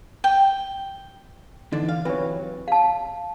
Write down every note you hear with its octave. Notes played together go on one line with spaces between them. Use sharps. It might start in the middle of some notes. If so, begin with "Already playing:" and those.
G5
D3 E3 D4 D#4 A4
F5
C3 E3 F#3 B4 C#5
F5 A5